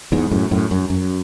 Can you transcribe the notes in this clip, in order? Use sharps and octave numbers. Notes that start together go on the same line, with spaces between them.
E2 G#2
F#2 A2
F#2 A2
F#2
F#2